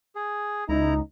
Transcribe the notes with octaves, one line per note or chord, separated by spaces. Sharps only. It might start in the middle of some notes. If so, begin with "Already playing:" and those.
G#4
C#2 D#4 E4 A#5